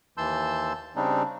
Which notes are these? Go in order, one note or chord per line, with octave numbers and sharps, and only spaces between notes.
D#2 E3 A5 C6 E6 G6
C#3 G3 C4 D4 D#4